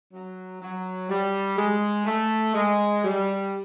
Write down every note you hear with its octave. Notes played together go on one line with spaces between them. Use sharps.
F#3
F#3
G3
G#3
A3
G#3
G3